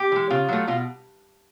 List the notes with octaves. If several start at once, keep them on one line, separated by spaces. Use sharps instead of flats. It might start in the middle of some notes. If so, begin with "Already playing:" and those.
Already playing: G4
E3 G#3
C#3 F4
F#3 A3
B2 F4